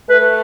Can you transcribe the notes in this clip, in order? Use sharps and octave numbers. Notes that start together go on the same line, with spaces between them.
A3 B4